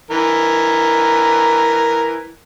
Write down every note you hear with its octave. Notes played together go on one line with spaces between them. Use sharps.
E3 A#4